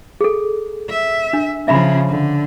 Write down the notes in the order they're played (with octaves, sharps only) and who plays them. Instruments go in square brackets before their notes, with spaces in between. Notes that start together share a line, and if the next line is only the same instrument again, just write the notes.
[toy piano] G#4 A4
[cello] E5
[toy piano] D4
[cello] C#3 F3 [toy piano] E5 A#5 B5
[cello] D3